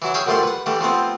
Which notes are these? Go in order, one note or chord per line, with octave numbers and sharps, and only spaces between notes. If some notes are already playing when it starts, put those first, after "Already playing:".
E3 F#3 E4
G#4 C#5 E5 F5 G5
F#2 D3 F3 G3 A3 C6
B4 F#5
D3 E3 G3 A3
F3 A3 B3 C4